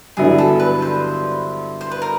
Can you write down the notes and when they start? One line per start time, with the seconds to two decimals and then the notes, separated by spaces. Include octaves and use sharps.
0.17 G2 D3 F#3 B3 E4 G#4
0.38 A4
0.60 B4
0.82 C5
1.81 C5
1.91 B4
2.02 A#4